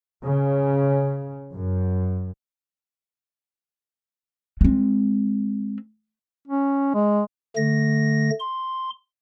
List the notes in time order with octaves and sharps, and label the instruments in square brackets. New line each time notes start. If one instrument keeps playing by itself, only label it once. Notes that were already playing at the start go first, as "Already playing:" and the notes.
[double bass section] C#3
F#2
[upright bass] G#3 C4
[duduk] C#4
G#3
[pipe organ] D3 A3 A#6
C6